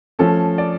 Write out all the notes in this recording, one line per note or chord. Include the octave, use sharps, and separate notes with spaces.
F3 A3 C#4 A4
D5